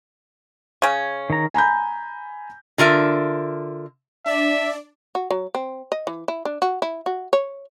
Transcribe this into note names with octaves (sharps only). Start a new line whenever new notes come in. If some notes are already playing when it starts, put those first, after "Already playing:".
C#3 C#4
D#3 A#5
G#5 A#5 B5 G6
D3 F4 A#4 E5
D4 D5 E5
F#4
F#3
C4
D#5
E3
E4
D4
F#4
E4
F#4
C#5